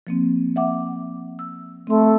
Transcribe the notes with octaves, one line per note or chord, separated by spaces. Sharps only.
F3 A#3 C4
E5 F#5 D6
E6
A3 C4 C6